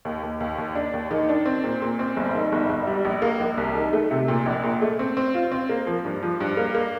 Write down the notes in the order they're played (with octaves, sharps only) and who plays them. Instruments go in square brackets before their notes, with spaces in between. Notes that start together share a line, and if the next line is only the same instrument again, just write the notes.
[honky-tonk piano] D#2
D#2
D#2
D#2
D4
D#2
D#3
D4
C4
A#2
A#2
C4
G1
D#3
G1
G1
G3
A#1
A#3
A#1
C2
D#3
A3
C3
A#2
A#1
A#2
A3
C4
C4
F4
C4
A#3
F3
G2
F3
G2
A#3
A#3